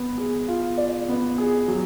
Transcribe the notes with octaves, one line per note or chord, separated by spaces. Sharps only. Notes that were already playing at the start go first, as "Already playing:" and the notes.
Already playing: B3
G#4
F4
D5
B3
G#4
F#3